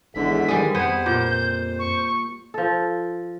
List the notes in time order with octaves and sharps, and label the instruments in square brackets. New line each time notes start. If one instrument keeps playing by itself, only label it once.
[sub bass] G#1 [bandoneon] E2 G#2 D3 [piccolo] B6
[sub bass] D#3 [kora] G3 G#4
[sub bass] F2 [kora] B3 [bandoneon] C5 [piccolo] G#6
[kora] A#2 [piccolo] G6
[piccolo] C#6
[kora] F3 A4